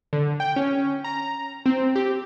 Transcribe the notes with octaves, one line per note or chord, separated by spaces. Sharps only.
D3
G5
C#4
A#5
C4
G4